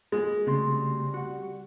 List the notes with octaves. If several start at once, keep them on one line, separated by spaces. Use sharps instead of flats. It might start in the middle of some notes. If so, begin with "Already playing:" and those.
G#3 A#3
C#3 G3 A3 C4 F#4 C6
F#4 F#5